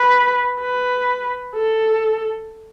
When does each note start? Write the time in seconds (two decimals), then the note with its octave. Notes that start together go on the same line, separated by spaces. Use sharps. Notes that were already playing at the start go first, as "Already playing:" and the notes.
Already playing: B4
0.60 B4
1.55 A4